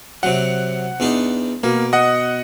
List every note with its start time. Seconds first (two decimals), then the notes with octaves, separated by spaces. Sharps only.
0.23 C3 F#3 F#5
1.00 E2 D4 D#4
1.63 B2 A#3
1.93 D#5 F#5